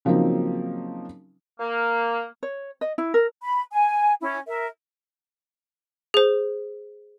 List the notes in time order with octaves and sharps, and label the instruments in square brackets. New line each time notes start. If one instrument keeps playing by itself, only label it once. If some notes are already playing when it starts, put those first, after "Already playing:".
[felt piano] C#3 F3 F#3 A#3 C4 D#4
[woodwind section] A#3
[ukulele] C#5
D#5
E4
A#4
[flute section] B5
G#5
C#4 E4
A#4 E5
[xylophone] G#4 C5